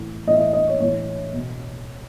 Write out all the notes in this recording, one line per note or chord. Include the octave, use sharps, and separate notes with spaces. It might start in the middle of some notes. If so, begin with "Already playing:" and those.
Already playing: A2 E3
A2 E3 D#5 E5
D#5
D#5
C#5
A2 E3 C#5
B2